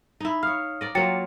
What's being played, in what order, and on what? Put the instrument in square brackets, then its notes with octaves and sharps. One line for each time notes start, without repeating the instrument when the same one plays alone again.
[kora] D#4 E4
[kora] C#5 F5 [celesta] D#6 F6
[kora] A#4 D5 D#5
[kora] F#3 A#3 F4 [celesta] G5 A6 C#7